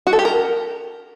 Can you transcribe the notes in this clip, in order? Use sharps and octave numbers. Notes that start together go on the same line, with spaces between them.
F#4
A4
G4
A#4